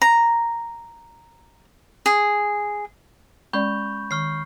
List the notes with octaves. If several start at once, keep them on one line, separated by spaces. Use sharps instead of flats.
A#5
G#4
G#3 C#4 D5 B5 C#6 G6
D#3 C#6 F6 C7